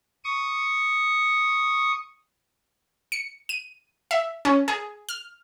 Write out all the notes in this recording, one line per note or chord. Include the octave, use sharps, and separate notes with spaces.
C#6 D#6
C#7
D#7
E5
C#4
G#4
F6